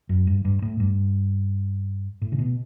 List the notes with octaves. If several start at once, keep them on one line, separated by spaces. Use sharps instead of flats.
F#2
G2
G2
A2
G2
A2
C#3
B2